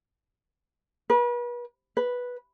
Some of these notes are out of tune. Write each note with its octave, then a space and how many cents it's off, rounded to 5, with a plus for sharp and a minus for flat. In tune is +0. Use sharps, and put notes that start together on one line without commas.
B4 -40
B4 -5